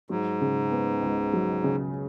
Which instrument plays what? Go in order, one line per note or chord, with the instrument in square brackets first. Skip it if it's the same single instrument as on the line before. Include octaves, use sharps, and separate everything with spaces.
[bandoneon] G#2 [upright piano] F#3
[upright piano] C#3
B3
C#2
F#3
C#3